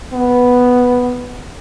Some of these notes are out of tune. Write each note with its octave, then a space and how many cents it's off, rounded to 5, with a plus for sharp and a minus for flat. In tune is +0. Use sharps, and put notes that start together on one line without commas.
B3 +0